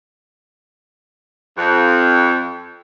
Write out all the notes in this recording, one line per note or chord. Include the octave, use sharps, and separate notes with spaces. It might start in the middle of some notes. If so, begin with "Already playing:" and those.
F2